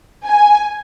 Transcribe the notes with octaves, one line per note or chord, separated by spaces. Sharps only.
G#5